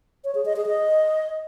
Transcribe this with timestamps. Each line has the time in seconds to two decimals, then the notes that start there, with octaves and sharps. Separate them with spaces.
0.24 C#5
0.35 G#4
0.46 D#5
0.56 G#4
0.67 D#5